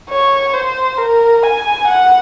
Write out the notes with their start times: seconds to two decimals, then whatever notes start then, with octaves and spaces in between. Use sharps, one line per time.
0.09 C#5
0.53 C5
0.97 A#4
1.43 G#5
1.87 F#5